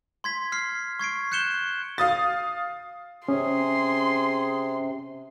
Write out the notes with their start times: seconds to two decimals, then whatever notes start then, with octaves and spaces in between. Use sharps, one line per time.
0.24 C6 G#6 B6
0.52 F6 C7
0.99 C#6 G#6 C7 D7
1.32 F#6 G6 C#7 E7 G7
1.98 F5 D#6 A6
3.28 C3 C#4 G#4 C6